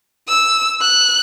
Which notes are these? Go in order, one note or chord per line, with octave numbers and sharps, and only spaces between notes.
E6
F#6